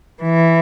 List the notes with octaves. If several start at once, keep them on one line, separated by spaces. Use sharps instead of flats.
E3